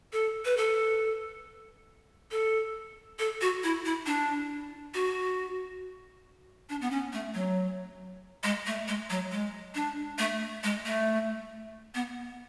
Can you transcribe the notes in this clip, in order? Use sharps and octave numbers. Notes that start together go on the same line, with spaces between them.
A4
B4
A4
A4
A4
F#4
E4
E4
D4
F#4
D4
B3
C#4
A3
F#3
G#3
A3
G#3
F#3
G#3
D4
A3
G#3
A3
B3